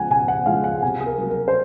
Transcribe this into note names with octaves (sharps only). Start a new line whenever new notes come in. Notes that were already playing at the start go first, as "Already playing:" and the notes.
Already playing: C#3 F3 G#3 C#4 F#5 G#5
C#3 G#5
F#5
F3 G#3 C#4 F5
F#5
C3 G#5
G#4
A#4
F#3 A#3
A#4
C5